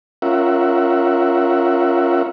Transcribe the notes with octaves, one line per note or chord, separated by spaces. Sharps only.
C#4 F4 A#4 E5 F#5